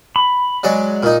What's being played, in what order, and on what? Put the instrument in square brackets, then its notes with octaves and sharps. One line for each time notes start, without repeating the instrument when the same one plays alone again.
[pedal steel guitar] B5
[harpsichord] F#3 G#3 D5
A#2 D#4